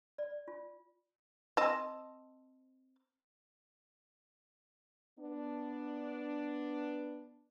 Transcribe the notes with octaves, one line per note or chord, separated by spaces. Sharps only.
D5
F4
C4 D#5 A5
B3 D4